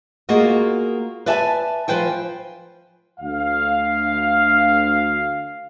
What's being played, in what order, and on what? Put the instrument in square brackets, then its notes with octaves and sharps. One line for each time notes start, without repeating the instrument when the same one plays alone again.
[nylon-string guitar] A#3 F4 F#4 G#4 D#5
B4 D5 E5 G#5 A5
F3 B4 C5 G5 G#5
[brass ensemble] D2 F5